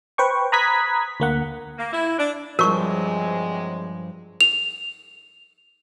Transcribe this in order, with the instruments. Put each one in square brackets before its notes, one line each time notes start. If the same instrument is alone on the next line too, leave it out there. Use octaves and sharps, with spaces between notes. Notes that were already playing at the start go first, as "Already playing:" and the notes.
[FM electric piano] B4 C5 G5 C#6
A#5 B5 D#6 F#6 G#6 B6
D2 A#3 F#5
[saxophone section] A#3
E4
D4
[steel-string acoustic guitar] G2 F3 [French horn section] C3 F#3 G#3 [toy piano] A#4 C#6
[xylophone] F7